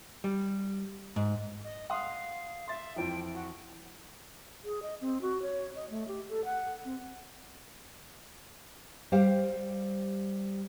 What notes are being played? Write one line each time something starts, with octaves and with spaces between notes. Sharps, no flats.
G3
G#2
D#5
F5 F#5 C6 D#6
E5 C6 A6
F2 E3 F3 G5
F#4
G#4
D#5
C4
F#4
C#5
D#5
A3
G4
A4
F#5
C4
G3 G4 C5 F5